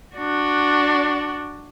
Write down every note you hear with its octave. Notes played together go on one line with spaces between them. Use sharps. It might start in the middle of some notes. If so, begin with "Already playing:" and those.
D4 F#4